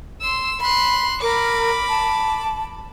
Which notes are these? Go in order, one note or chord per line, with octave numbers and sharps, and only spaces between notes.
C6 E6
B5 C6 F#6
A#4 B5 D6
A5